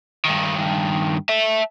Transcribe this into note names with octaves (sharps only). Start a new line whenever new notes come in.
G2 D#3
E5 A5